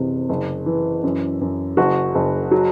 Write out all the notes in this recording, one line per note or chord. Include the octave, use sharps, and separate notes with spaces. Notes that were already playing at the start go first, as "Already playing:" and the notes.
Already playing: F#1 C3 E3
F#1
E3
F#2
F#2
F#1 F#4
F#1
F#3